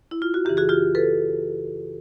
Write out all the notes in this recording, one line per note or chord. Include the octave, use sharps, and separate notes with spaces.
E4
F4
F#4
F#2 C#3 E3 G4
F#4 G#4
F4 G4
A4 B4